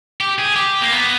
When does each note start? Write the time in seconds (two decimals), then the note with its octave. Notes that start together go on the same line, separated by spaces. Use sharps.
0.21 G4
0.38 G#4
0.56 G4
0.81 A#3
0.92 B3